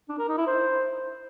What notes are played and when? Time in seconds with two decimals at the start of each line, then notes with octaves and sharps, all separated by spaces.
0.09 D4
0.19 A#4
0.28 D#4
0.38 E4
0.47 C5